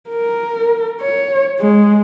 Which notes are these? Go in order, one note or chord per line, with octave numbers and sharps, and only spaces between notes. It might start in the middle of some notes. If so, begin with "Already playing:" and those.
A#4
C#5
G#3